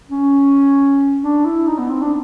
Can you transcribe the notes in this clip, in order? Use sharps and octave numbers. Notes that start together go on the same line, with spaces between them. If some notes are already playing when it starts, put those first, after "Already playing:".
C#4
D4
E4
D#4
B3
C4
D4